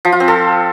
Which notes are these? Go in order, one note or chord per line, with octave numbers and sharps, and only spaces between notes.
F3
F4
C4
A4